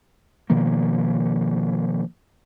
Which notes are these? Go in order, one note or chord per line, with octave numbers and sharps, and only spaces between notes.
B2 D#3 F3 A#3